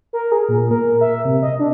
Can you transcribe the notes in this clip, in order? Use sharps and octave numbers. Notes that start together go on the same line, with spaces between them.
A#4
G#4
A#2
A#4
E5
C3
D#5
D4